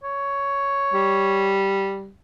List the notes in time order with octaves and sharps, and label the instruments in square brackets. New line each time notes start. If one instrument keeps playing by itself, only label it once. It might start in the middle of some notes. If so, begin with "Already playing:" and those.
[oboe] C#5
[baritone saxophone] G3